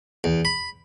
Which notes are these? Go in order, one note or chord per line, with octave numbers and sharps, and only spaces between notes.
E2
B5